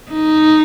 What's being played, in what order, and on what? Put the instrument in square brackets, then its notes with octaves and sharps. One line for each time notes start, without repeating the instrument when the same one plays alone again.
[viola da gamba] D#4